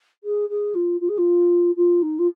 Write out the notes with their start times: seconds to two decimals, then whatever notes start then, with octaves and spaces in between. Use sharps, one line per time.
0.24 G#4
0.49 G#4
0.75 F4
1.01 F4
1.09 G#4
1.18 F4
1.77 F4
2.02 D#4
2.19 F4